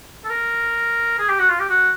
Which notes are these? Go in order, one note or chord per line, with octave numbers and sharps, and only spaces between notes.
A4
A#4
G#4
G4
F#4
F4
G4
F#4